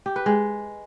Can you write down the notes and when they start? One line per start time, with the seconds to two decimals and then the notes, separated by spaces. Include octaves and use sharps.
0.06 G4
0.16 B4
0.26 G#3